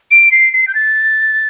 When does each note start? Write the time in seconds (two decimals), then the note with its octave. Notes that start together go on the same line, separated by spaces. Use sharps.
0.11 D7
0.31 C7
0.53 C7
0.68 G6
0.75 A6